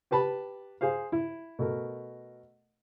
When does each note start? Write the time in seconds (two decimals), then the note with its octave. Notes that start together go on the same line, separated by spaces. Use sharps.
0.11 G4 B4 A5 B5
0.81 G#4 C5 F5
1.12 E4
1.59 B2 A3 A#4